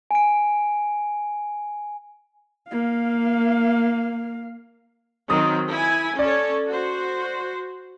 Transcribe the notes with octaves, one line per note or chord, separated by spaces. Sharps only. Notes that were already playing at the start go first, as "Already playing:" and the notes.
G#5 D7
A#3 F5
D#3 F#3 C4 D#6
E4 G#5
C#4 A4 C#5 D5
F#4 C5